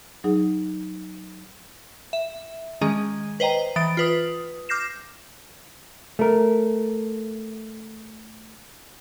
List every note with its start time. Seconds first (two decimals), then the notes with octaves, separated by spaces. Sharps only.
0.24 F#3 D#4 G#4
2.13 E5
2.81 D#3 G#3 C#4 G#4
3.40 B4 C5 D#5 G5 A#5
3.76 E3 D#6 A6 D7
3.97 F4 B4 D#6
4.69 D6 F6 G6 A#6 C7 E7
6.19 A3 A#4